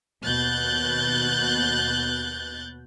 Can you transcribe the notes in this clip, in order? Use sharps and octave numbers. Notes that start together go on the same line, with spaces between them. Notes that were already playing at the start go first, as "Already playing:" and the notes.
D#2 B2 F#6 G6 A6